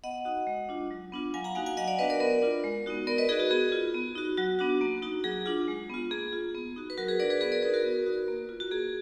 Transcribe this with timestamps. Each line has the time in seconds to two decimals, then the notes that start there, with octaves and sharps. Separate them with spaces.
0.04 B3 D#5 F#5
0.25 D#4 F#4
0.47 G#3
0.69 D4 F4
0.91 F#3
1.12 B3 D4 F4
1.34 F#3 F5 G#5
1.44 F#5 A#5
1.55 A#3 D#4 F#4 F5 G#5
1.66 F5 G#5
1.77 F#3 D#5 F#5
1.88 D5 F5
1.99 B3 D4 F#4 B4 D#5
2.10 A#4 D5
2.20 B3 A#4 D5
2.42 D4 F4
2.64 G#3
2.86 B3 D#4 F#4
3.07 B3 A#4 D5
3.18 B4 D#5
3.29 D#4 F#4 G#4
3.40 F#4
3.51 B3 G#4
3.72 F4
3.95 B3
4.15 D#4 F#4
4.37 F#3 F#4
4.59 B3 D4 F#4
4.81 A#3
5.02 D#4 F#4
5.24 F#3 G#4
5.46 D4 F4
5.68 G#3
5.90 B3 F4
6.11 A#3 G#4
6.33 F4
6.55 B3
6.76 D#4 F#4
6.90 B4
6.98 F#3 F#4 A#4
7.08 G#4 B4
7.19 D4 A#4 D5
7.24 F#4
7.30 G#4 B4
7.41 B3 G#4 B4
7.52 A#4 D5
7.63 D#4 F#4 G#4 B4
7.74 F#4 A#4
7.84 B3
8.06 D#4 F#4
8.28 A#3
8.49 F4
8.60 F#4
8.71 A#3 G#4